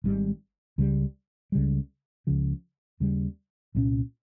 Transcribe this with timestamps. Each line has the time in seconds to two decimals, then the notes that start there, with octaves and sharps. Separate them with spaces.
0.04 G#1 G#2 G3
0.78 C#2 C#3 G3
1.52 C#2 C#3 G3
2.27 C#2 C#3 F3
3.00 D#2 C#3 G3
3.75 C2 A#2 G#3 C#4